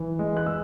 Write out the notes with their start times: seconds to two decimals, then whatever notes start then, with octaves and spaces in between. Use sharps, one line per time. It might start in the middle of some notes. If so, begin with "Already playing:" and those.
Already playing: E3
0.19 G#3
0.37 F#6
0.46 G#3 E6